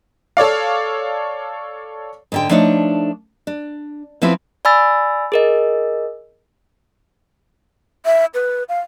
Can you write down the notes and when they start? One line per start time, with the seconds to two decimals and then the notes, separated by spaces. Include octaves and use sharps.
0.37 A4 C#5 D5 F5
2.32 G#2 D3 G5
2.50 F3 A3 D4 D#4 C#5
3.47 D4
4.22 F3 B3 C4 E4 B4
4.65 D5 G#5 B5 E6 A6
5.32 G#4 A#4 D#5
8.05 E5
8.34 B4
8.69 F5